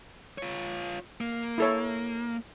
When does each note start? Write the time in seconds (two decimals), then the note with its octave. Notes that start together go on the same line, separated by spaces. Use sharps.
0.38 F4 C#5
1.21 A#3
1.58 E4 A4 C#5